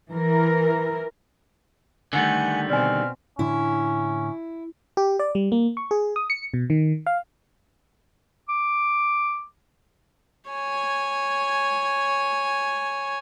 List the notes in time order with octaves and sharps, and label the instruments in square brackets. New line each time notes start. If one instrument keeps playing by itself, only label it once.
[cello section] E3 A#4
[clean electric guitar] D3 D#3 G3 [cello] A3 F#5 [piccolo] G#5
[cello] B2 C4 [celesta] D5 G#5 [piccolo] F6
[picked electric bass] A2 D3 D4 [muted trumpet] C#4 [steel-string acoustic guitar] E4
[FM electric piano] G4
D5
G3
A#3
C#6
G#4
D#6
C#7
B2
D#3
F5
[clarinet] D6
[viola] C#5 G#5